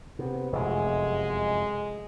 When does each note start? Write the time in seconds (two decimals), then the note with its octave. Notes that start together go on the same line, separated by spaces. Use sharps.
0.19 C3 B3
0.53 F1 F#2 G#3